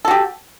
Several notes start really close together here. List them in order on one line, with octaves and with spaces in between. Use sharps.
A4 F#4 G4